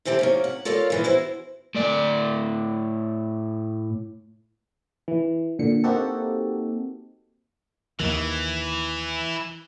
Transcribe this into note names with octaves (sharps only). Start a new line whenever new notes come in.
C3 E3 C4 G4 A4
C3 A#3 C#4
F#5
F4 A4 A#4 C#5 D5 F5
A#2 E3 A#3
B3 E4 F#4 C5
A2 D5
E3
A#2 D3 C#7
A#3 C4 D#4 F#4 G4 A4
D#2 D#3 E3